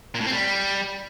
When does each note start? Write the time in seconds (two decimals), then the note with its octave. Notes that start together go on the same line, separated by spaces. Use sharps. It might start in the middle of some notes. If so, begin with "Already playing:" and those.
0.15 A#2
0.20 A2
0.26 C4
0.32 G3